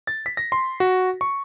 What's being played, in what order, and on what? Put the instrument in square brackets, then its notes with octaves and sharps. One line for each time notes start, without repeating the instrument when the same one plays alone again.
[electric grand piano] A6
B6
A#6
C6
F#4
C#6